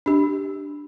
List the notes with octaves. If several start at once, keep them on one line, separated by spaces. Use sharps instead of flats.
D4 G4